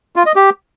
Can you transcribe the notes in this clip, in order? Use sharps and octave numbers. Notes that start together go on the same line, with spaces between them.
F4
D#5
G4